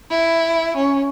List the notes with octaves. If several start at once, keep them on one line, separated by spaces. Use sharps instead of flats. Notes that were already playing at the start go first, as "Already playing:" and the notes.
E4
C#4